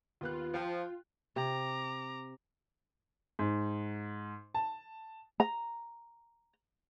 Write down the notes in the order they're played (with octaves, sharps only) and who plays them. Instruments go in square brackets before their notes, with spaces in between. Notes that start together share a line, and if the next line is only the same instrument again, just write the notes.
[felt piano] D#2 B3 F#6 [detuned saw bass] F4
[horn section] F3 [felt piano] F5 G5
[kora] C3 [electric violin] A#5 D6
[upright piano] G#2
A5
[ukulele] A#5